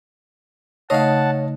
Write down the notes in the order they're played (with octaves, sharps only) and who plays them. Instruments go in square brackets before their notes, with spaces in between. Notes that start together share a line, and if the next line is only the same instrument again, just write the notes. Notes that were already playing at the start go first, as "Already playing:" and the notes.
[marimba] C#3 A3 D#4 [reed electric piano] C#5 [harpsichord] D#5 F5 [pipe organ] F#5 A5